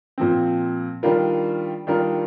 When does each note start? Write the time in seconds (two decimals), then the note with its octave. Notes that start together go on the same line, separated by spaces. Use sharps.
0.18 A#2 F3 C4
1.03 D#3 G3 D4 F4 A#4
1.87 D#3 G3 D4 F4 A#4